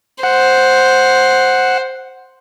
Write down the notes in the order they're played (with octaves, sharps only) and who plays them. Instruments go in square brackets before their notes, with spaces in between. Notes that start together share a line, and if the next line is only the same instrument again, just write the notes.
[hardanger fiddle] C5 [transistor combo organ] F#5